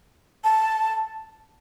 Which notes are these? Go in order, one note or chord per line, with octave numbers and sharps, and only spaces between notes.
A5